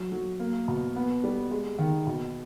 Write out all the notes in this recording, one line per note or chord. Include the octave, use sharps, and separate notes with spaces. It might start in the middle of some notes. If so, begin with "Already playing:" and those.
Already playing: F#3
F#3
A#3
B2
B3
G3
G#3
D#3
B2